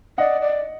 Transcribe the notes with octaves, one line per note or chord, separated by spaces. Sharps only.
D5 D#5 F#5
D5